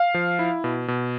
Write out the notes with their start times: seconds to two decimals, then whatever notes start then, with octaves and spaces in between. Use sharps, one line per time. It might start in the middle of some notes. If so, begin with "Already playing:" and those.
Already playing: F5
0.14 F3
0.39 E4
0.64 B2
0.88 B2